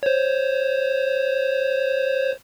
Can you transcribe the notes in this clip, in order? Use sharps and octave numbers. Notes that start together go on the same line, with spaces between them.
C5 C#5